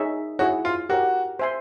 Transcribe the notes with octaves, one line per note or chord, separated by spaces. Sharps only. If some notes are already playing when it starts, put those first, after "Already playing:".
Already playing: D#4 G#4 C#5 E5
E4 F#4 G#4 C#5
F4
F#4 G4 A#4 C#5
C5 E5 G#5 C6